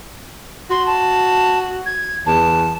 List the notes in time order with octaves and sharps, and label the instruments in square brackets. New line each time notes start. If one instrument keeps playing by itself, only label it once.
[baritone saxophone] F#4 [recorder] C6
[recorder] A5
G#6
[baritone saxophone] E2 [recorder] A5